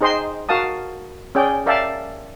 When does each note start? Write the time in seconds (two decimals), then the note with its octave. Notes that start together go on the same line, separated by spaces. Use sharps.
0.01 D#4 G#4 C5 D#5 G5 C6
0.49 F#4 A#4 F5 A5 D#6
1.35 C#4 G#4 D5 G5
1.66 A#4 D5 E5 F5 G5 A5